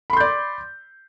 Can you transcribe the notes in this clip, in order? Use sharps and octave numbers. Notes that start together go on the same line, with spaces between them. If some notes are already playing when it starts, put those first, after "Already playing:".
D5 B5 C6 G6